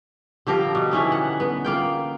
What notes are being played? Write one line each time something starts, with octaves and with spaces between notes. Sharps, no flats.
D3 F3 G4 A#4
B2
D3 E3 C#4 D#4
F#5
B3
A#3 F4 G5